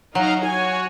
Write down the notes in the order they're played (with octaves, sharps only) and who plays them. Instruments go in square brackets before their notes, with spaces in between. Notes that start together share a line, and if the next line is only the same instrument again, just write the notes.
[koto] F#3 [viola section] D#4 [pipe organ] F5 A#5
[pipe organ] F#4 C#5 [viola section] G#5